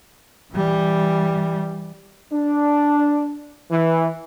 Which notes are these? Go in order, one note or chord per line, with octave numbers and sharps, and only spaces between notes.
E3 G3
D4
E3